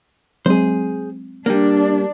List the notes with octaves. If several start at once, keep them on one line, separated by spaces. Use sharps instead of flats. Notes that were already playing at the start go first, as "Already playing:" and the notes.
F#3 G#3 C4 G#4 C5
G3 A#3 D4